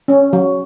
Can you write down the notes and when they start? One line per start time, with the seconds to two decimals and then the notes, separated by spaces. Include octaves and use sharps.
0.08 C#4
0.33 F#3